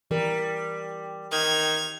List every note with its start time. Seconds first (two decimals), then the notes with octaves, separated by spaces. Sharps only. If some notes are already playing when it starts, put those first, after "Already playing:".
0.11 E3 G3 A#4
1.32 D#3 G#6 F7